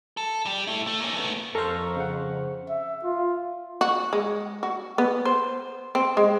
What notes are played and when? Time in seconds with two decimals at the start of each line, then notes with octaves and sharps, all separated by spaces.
0.17 A4
0.45 G3 G4
0.67 A3 E4
0.87 A3
1.01 A#3 C#4
1.16 A3 B3
1.55 F2 A4 C5 F5 A#5 C#6
1.96 C#3 F#5
2.70 E5
3.04 F4
3.81 F#4
4.13 G#3
4.63 F#4
4.98 B3
5.25 C5
5.95 C4
6.17 G#3